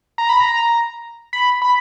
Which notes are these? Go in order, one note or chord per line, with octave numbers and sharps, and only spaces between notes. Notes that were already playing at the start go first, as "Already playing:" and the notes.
A#5
B5
A#5
B5
B5